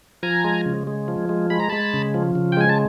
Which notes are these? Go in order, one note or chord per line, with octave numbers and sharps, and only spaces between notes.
F3 G#5 A#5
G#3
C#3
G#3
F3
G#3
G#3 B5
A#5
G#3 A5 B5
C#3
F3
C#3
G5
G#3 G#5
A5